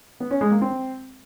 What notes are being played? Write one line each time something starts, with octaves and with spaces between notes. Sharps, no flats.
B3
C#4
G#3
A#3
C4